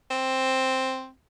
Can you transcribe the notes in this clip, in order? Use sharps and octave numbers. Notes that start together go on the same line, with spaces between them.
C4